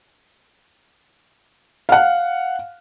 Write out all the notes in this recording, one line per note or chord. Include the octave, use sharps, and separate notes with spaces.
F5 F#5